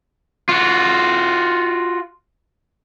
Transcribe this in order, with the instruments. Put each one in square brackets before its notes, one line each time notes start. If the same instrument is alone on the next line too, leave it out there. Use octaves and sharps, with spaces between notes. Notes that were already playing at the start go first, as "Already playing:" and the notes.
[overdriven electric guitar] F4 F#4